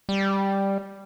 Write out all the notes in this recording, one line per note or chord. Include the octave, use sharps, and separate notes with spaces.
G3